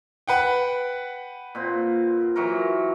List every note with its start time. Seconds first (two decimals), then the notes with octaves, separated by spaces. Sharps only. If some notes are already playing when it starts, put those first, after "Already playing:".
0.28 B4 F#5 G5
1.55 A#2 C4
2.36 E3 F#3 A#4